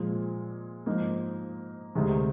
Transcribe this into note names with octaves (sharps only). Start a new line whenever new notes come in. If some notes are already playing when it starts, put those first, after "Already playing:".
Already playing: A#2 F3 G#3
G#2 F3 A#3 D#4
D2 C3 D#3 G#3